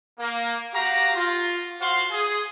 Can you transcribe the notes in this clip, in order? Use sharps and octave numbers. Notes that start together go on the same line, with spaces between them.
A#3
F#4 G4 F5 A#5
F4
F#4 C5 F5 C6
G#4